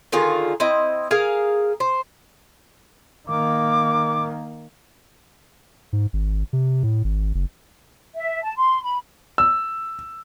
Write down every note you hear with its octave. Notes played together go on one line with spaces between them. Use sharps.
D3 D#3 F4 G#4
C4 E4 D#5
G#4 A#4 F5
C5
D#3 A#3 D6
G#2
G#1
C3
A2
G#1
F#1
E5
A5
C6
B5
E6